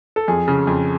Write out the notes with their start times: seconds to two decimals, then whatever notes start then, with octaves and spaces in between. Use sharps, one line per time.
0.16 A4
0.28 F2 G#4
0.48 C#3
0.67 F2